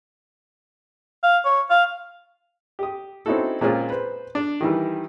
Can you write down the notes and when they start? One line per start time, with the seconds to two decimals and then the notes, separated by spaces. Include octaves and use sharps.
1.23 F5
1.45 C#5
1.70 F5
2.79 G4 D#6
3.26 C4 C#4 D#4 E4 F#4 A4
3.61 A#2 G#3 C4 C#4 F4 G#4
3.90 B4 C5
4.35 D4
4.61 D#3 E3 G3